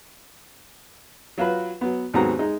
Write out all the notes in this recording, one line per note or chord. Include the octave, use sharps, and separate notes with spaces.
F#3 F4 F#4 B4
F#3 B3
D#2 G#2 F#3 B3 C4 A#5
G#3 D#4